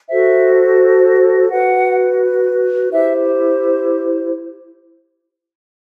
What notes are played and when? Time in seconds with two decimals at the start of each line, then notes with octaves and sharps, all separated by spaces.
0.09 F#4 A4 C5 E5
1.49 F#4 B4 F#5
2.92 E4 G4 C5 E5